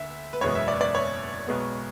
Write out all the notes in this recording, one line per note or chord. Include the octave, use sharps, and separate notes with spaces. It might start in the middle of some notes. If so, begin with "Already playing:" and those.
Already playing: D2 D3 E5
B4
F#1 E2 B2 G#3 B3 C#5
E5
D5
D5
C#5
B1 B2 G#3 B3